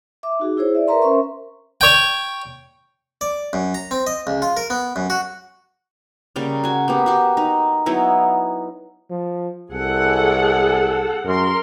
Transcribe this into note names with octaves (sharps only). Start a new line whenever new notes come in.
E5 D6
D#4 F#4 G#4
E4 G#4 C5 C#5
D5 E5
A#4 B4 E5 A#5 C6
C#4 A#4 C5 E5 C6 C#6
C#5 G5
D5
F#2
A#5
C4
D#5
C#2
F4
A#4
B3
F#2
F#4
C#3 G3 A#3
F#4 G#5
A#3 B3 G4
F#4 G4
D#4
F#3 B3 D#4 E4
F3
C2 G#4 A4 F#5
F#2 A#4 C6